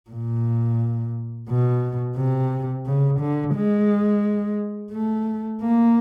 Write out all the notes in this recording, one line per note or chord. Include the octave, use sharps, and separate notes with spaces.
A#2
B2
C3
C#3
D3
G#3
A3
A#3